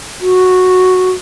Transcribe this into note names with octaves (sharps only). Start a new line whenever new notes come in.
F#4